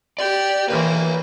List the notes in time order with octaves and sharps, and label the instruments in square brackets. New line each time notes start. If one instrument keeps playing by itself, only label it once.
[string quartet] G4 [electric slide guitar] D5
[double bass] E3 [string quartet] A#3 [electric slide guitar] B4 C#5